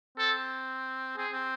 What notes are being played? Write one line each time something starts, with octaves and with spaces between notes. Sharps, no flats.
C4 A4
C4 G#4
C4